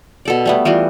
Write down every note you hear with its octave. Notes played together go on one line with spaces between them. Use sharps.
B2 A4 D5
G3 A3 B3
E3 G3 F4 F#4